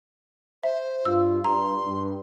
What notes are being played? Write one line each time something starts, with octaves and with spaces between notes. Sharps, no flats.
C5 E5
G2 F4 E6
G2 A#5 C6
G2